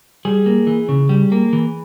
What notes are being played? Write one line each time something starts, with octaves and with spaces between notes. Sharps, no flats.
G3 G#4
A#3
E3
C#3
G3
A#3
E3